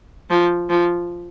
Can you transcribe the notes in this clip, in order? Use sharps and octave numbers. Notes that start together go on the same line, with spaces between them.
F3
F3